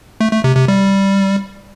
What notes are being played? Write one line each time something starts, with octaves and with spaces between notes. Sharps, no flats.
A3
A3
C3
C3
G3